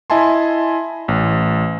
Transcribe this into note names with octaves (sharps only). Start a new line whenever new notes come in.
E4 D#5 E5 G#5 A5 C6
A1